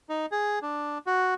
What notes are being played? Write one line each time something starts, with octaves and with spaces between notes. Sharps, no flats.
D#4
G#4
D4
F#4